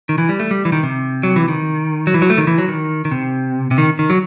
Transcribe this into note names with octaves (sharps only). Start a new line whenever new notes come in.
D#3
E3
G3
A3
G3
E3
D#3
C3
F#3
E3
D#3
F#3
E3
F#3
A3
D#3
E3
F#3
D#3
D#3
C3
C3
D#3
D#3
F#3